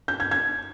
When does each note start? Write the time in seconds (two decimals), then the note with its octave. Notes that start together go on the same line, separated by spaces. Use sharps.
0.08 G6
0.20 G#6
0.31 G#6